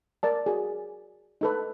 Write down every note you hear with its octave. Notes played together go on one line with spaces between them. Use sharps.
A#4 D5 A5
F#4 G#4
D#4 A4 B4